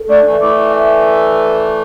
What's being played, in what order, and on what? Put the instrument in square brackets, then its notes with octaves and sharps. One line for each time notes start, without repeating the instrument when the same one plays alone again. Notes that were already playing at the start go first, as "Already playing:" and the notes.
Already playing: [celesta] A4
[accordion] A3 D4 [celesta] D5
[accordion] E3 A3
[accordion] E3 A3 [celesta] D6
[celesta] E5